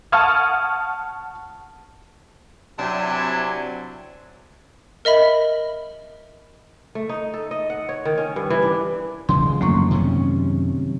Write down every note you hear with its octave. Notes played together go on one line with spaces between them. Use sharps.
F#5 A5 C#6 D#6 F6 G#6
C3 F#3 C4 D4 E4 G#5
A#4 D#5 E5 B5
A3
D#4
A4
D#5
F#5
C#5
D#3
C#4
G2
E3
D4
C#3 F3 G#3 C6
G#1 F#2 D3 F3 A3 A#3 C#6
C3 D#3 C#4